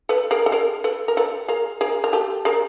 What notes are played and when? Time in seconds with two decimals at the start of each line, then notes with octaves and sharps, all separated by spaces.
0.09 A4 B4
0.31 G#4 A#4
0.46 A4
0.52 G#4 A#4
0.84 A4 B4
1.08 A#4
1.17 A4 B4
1.48 G#4 A#4
1.81 G#4 A#4
2.04 A#4
2.13 G4 A4
2.45 G#4 A#4